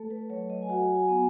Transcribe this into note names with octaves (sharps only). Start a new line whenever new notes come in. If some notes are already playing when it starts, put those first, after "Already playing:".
Already playing: A3 A4
B4
F#3 C#5
D#5
G#5
F#4 F#5
G#5
B3